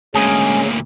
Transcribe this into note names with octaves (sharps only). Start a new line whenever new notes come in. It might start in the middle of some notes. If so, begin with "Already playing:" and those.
D2 A#2 G#3 C#4 G#4